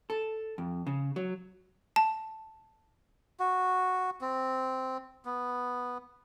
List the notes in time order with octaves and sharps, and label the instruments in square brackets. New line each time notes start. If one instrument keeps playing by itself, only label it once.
[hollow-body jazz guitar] A4
F2
C#3
F#3
[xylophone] A5
[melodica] F#4
C4
B3